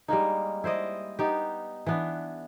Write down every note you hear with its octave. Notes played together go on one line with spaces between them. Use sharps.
G3 G#3 A#3 D#4
E4 C5 D5 D#5
B3 D#4 G4
E3 B3 D4